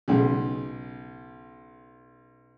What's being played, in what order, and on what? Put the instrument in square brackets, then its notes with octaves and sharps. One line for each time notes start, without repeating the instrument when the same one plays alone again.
[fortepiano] B1 C#3